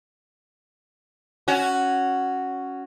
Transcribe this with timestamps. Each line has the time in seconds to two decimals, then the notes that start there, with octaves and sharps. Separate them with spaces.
1.48 C#4 F#4